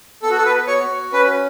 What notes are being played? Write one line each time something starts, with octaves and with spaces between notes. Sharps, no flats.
B3 A4
F#4
A4
B4
F#4 C#5
C#4 B4